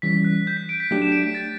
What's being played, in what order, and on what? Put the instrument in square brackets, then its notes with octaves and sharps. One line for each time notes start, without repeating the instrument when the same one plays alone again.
[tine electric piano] E3 G3 C#4 [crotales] B6
[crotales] F#6
G6
B6
D7
B6
[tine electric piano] F#3 A3 D4 G4 [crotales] D7
[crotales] E7
D7
B6
A6